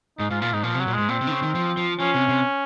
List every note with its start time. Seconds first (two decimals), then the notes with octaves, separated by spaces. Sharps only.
0.18 G#2 D#4
0.31 G#2 F4
0.41 A#2 F4
0.53 G#2 D#4
0.63 A#2 F3
0.75 C3
0.80 F#3
0.87 A#2
0.94 G#2 G#3
1.09 A#2 C4
1.21 C3
1.27 D#3
1.31 C#3
1.43 D#3
1.55 F3
1.77 F3
1.99 F3 C#4
2.14 C3
2.29 C3